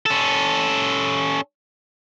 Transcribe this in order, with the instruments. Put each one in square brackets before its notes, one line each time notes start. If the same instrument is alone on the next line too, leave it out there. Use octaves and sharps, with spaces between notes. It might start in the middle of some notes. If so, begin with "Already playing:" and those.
[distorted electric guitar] C#4 A4